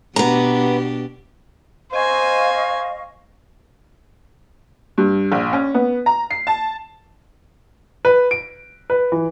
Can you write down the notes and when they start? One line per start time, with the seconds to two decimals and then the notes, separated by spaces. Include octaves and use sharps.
0.16 B2 B3 D4 G4 A#5
1.92 C5 D#5 F5 G#5 C#6
4.98 G2
5.32 A#1
5.53 C#4
5.74 B3
6.06 A#5
6.31 C7
6.47 A5
8.05 B4
8.31 D7
8.90 B4
9.12 E3